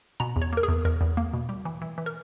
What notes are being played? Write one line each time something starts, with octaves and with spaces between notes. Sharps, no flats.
B2 A#5
E2
C#5
A#3 A#4
G#4
E2
E2 A#4
E2
A#3
B2
G3
E3
E3
E3
A#4